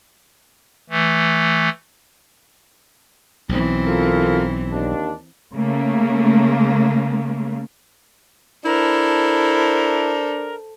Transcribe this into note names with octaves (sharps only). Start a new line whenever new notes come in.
E3 A3
B1 E3 C4
F4 A4 A#4
D#2 D4
C#3 A3 A#3
D4 E4 A4 A#4 C5